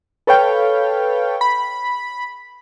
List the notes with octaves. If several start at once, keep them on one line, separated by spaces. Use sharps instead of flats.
A4 B4 C#5 F5 G5
B5